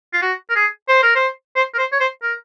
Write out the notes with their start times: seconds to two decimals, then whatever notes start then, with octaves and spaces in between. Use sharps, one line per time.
0.13 F4
0.22 F#4
0.50 A#4
0.55 G#4
0.88 C5
1.03 A#4
1.15 C5
1.56 C5
1.74 A#4
1.78 C5
1.92 C#5
2.00 C5
2.23 A#4